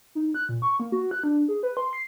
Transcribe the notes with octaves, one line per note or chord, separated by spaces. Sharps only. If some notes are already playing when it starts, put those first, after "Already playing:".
D#4
F#6
A#2
C#6
A#3
F#4
F#6
D4
G#4
B4
C6
C7